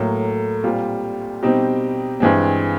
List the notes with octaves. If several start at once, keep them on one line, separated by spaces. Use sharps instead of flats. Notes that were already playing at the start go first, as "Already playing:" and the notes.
Already playing: A2 F#3 A#3
A#2 G3 C4 F4
B2 G3 C4 D#4 G4
G2 E3 G#3 C4